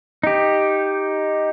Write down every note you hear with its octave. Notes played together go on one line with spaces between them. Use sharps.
D#4 G4